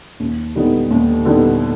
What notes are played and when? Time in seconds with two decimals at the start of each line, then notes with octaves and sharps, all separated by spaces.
0.20 D#2
0.55 D3 G3 B3 D#4
0.91 D#2
1.25 D3 G3 B3 D#4